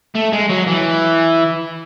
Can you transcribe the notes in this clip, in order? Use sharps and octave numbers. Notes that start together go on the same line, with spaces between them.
A3
G#3
F#3
E3